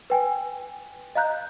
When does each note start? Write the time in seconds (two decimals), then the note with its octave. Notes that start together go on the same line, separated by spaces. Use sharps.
0.10 B4 G5 G#5
1.15 D#5 F5 A#5 F#6 G6